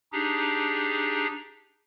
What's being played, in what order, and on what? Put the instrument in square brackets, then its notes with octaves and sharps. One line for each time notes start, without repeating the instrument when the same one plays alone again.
[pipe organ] D4 D#4 G4 G#4